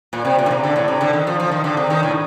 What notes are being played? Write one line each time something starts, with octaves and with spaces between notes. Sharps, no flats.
A#2
C3
A#2
D3
C3
D3
A2
C3
D3
D#3
F3
F3
D#3
D3
C3
D#3
A2